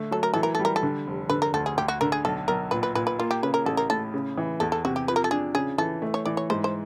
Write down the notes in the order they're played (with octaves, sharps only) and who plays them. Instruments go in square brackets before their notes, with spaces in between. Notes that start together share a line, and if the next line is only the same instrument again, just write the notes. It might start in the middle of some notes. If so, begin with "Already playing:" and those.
Already playing: [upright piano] D3 A3
[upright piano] F#3 [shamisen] A4
[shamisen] A#4
[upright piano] E3 [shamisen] A4
[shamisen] A#4
[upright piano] G3 [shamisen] A4
[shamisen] A#4
A4
[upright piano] D3
F1
[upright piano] D3 [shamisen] B4
[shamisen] A#4
[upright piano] D2 [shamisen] A4
[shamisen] G#4
[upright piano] D2 [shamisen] G4
[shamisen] F#4
[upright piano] D3 [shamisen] A#4
[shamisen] G#4
[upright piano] B1 [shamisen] A4
[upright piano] B1 [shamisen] A#4
[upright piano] A#2 [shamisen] B4
[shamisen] B4
[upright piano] A#2 [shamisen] B4
[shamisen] B4
[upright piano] A#3 [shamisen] F4
[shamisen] G4
[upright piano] C#3 [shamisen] B4
[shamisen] A#4
[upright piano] A1 [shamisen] A4
[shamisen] A#4
[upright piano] A2 [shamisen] A4
[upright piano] C#3
E3
[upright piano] E2 [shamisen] A4
[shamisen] A4
[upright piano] C3 [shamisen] F#4
[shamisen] G4
[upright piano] F3 [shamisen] B4
[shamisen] A#4
A4
[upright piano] D4 [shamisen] G#4
[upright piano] C#3 [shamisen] G#4
[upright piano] E3 [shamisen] A4
[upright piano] A3
[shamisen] C#5
[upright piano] E3 [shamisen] D5
[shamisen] C#5
[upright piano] G#2 [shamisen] C5
[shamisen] C5